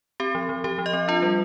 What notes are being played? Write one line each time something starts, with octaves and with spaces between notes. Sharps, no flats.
C4 G4
F3
F3
F3 G4
F3
D#5
C4
D4 F4
G3